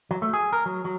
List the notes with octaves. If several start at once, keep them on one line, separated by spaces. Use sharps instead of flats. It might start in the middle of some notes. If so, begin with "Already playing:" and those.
F#3
A3
G#4
A#4
F#3
F#3